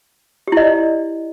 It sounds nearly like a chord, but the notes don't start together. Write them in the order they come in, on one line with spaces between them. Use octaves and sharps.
G4 E4 D#5 D5